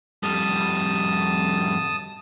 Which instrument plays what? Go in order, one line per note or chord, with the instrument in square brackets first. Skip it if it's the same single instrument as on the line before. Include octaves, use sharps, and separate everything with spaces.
[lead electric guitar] F2 G3 [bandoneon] A5 D#6